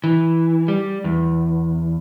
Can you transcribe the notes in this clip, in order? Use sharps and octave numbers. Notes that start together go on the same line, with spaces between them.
E3
G3
E2